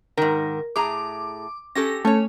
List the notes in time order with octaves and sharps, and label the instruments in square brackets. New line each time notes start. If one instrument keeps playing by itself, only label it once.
[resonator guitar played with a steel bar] G#2 D#3 [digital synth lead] A#4
[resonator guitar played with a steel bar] A2 G#4 A#5 [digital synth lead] D6
[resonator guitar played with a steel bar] C#4 G4 A4 [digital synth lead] A#6
[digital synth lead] A3 [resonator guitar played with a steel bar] C#4 C#5